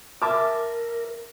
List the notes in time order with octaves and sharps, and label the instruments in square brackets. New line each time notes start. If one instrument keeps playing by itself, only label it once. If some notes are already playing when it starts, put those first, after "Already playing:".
[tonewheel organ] A#4 [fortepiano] E5 A5 D6